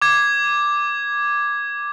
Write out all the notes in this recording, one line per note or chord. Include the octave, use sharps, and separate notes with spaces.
D6 G#6